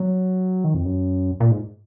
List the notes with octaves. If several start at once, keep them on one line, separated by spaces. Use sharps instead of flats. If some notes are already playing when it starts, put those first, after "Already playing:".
Already playing: F#3
D#3
F2
F#2
A#2
G#2